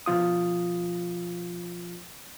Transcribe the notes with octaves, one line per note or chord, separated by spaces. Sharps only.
B2 F3 F4 D#6